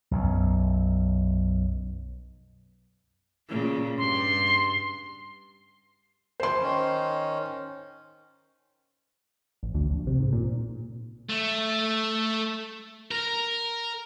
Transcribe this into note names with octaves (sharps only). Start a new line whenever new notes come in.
B1 F#2
A#2 C#3
G2 C6
C5 C6
D#3 C#4
A1
D2
A#1
C3
G#2
A#2
A3
A#4